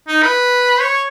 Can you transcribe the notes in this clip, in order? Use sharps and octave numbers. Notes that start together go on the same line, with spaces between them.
D#4
B4
C#5